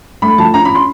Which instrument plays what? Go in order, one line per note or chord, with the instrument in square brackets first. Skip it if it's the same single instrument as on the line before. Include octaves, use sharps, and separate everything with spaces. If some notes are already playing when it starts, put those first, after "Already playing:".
[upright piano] A3 B5
F3 A5
C#4 A#5
B5
C6